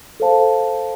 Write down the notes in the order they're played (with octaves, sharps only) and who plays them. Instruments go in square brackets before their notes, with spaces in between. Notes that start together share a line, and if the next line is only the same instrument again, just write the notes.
[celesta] A4 C5 F5 A5